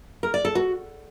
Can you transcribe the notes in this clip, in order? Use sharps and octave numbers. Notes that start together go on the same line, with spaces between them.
A#4
D5
A4
F#4